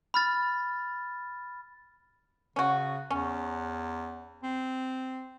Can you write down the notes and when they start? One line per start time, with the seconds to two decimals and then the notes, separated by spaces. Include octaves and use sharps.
0.14 B5 F6 A6
2.56 C#3 C#4 F#4
3.10 E2 C#4
4.43 C4